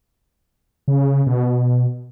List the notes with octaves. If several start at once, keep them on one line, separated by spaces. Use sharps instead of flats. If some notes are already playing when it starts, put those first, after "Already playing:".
C#3
B2